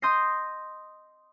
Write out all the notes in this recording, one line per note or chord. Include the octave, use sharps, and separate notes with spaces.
D#5 C6 D#6 G6 A#6 C7